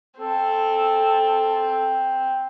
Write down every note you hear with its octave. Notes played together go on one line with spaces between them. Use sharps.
C4 A4